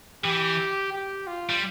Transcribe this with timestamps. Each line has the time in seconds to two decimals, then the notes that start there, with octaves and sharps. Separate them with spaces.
0.24 E3 G4
0.93 G4
1.27 F4
1.50 G3